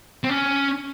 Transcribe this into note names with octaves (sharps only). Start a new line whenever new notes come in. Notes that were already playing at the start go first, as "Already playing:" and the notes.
C4
C#4